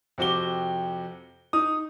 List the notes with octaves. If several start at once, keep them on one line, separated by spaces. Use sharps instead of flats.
F2 C3 F#4 D6 G7
D#4 D#6